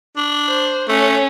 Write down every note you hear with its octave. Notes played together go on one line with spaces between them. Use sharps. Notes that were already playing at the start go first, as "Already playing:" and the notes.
D4
C5
A3 C#4